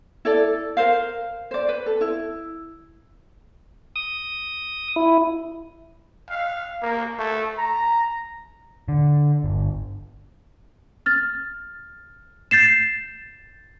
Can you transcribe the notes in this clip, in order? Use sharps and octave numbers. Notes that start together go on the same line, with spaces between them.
E4 A4 D5
A#4 C5 F5
C5 D5
B4
A4
E4
D#6
E4
F5
A#3
A3
A#5
D3
G1
F6 A6
G6 A6 C7 E7